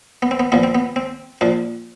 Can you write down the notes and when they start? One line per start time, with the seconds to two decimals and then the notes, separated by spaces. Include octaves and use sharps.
0.22 B3
0.31 C4
0.40 B3
0.52 A#2 F3 B3
0.63 C4
0.75 B3
0.96 C4
1.41 A#2 F3 D4